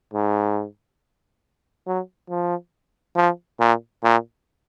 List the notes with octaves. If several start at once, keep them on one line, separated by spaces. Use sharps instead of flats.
G#2
F#3
F3
F3
A#2
A#2